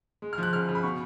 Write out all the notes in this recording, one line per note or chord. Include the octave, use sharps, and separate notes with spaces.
G#3
F6
F3 F#6
C#3 F6
C#3
B5
B2 C#6